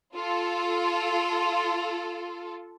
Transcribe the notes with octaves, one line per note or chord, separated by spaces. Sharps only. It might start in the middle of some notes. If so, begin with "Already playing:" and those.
F4 A4